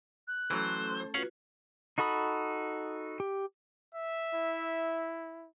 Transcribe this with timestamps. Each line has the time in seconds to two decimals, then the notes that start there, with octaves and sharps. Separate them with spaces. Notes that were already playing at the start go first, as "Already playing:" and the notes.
0.28 F#6
0.51 E3 F#3 A3 C#4 A4 C5
1.14 C#4 F4 F#4 B4 F5 F#5
1.98 D#4 F#4 A4 B5 D#6
3.20 G4
3.95 E5
4.35 E4